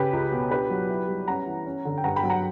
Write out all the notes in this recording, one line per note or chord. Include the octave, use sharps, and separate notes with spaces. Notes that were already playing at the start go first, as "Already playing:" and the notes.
Already playing: C#3 G4 B4
C#2
B2
D4 G4 B4
F#3
E4
G3
C#4 F#5 A#5
E3
C#4
D3
G5
G2 F#5 A#5
G5 B5
F#3
F#5 A#5